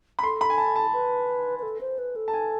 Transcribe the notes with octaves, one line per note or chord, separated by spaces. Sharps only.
B5
A4 C6
B5
G#5
A5
A5
B4
B4
A4
C5
B4
A4
A5
G#5